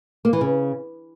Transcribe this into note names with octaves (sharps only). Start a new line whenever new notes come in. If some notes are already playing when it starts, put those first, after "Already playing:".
A#3
E3
C#3